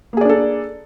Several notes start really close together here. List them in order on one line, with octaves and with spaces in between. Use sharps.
A#3 G#4 D5 D4 A4